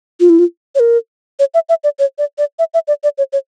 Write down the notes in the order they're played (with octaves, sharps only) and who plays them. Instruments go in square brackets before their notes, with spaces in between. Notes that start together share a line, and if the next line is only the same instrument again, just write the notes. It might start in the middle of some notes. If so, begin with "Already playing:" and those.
[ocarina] F4
E4
F4
C#5
A#4
C#5
E5
E5
D5
C#5
D5
D5
E5
E5
D5
D5
C#5
C#5